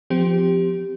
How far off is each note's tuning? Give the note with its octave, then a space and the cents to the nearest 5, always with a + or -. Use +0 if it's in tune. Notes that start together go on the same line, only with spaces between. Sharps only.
F3 +0 C4 -25 G4 +0